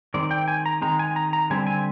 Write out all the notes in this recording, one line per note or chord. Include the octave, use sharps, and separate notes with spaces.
D#3 G#3 C4 D5
G5
G#5
A#5
D#3 G#3 C4 A#5
G#5
A#5
A#5
D3 G3 C4 G#5
G#5